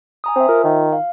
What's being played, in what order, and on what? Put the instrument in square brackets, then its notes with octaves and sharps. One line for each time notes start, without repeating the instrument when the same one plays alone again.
[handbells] G#5 A#5 D#6
[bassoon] C4 [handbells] C5 E5
[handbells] F4 [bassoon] A#4
[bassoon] D#3
[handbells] F5